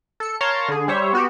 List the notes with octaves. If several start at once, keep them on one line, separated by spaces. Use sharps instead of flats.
A4 C#7
A#4 C#5 F5 A5 A#5 C6
D3 G#4
G3 C5 C#5 E5
B3 F#4 G4